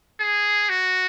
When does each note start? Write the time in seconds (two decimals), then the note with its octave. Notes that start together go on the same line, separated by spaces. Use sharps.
0.20 G#4
0.69 F#4